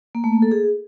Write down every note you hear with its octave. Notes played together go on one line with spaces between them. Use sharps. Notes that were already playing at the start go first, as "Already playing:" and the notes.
A#3
A3
A#3
A4
G#4